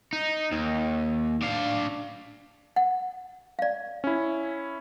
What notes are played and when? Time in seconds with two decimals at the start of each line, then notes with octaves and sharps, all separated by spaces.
0.13 D#4
0.52 D#2
1.42 D4 F5
2.76 F#5
3.59 D5 F5
4.04 C#4 E4